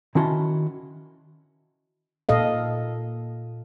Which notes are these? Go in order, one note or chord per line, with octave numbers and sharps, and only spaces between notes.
D#3 C#4 E4 F#4 A5 C6
A#2 A4 D#5 F5